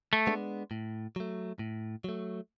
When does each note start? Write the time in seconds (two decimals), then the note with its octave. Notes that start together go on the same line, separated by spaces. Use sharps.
0.13 A3
0.27 G#3 B3 D4
0.71 A2
1.16 F#3 A3
1.59 A2
2.04 F#3 A3